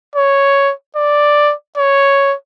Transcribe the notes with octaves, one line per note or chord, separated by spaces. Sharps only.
C#5
D5
C#5